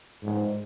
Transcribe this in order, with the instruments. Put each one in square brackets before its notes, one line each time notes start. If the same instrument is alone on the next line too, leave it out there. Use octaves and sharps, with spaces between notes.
[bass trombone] G#2